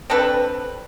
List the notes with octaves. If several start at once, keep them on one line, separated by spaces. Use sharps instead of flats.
C4 D4 A4 B4